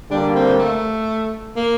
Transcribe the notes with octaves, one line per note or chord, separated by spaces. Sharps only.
D3 G3 A#3 D4
C4
A3
A#3